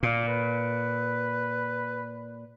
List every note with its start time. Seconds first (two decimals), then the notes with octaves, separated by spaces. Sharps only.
0.03 A#2 A#3
0.28 B4